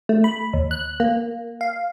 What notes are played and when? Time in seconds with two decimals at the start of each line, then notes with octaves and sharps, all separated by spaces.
0.09 A3
0.24 B5
0.53 D#2
0.71 F#6
1.00 A#3
1.61 F5